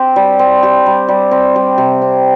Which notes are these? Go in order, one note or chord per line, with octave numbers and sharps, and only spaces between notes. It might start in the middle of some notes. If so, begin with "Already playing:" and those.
Already playing: C4 G4
G3
C4
G4
G3
G3
C4
G3
C3
C4